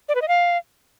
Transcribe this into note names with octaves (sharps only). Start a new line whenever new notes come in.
D5
B4
D#5
F5